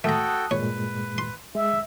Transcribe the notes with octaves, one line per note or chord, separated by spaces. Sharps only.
A3 F#4 A4 G5 A5 A#5 D#6 F#6
G2 A#2 G#3 B4 C#5
C6
G#3 E5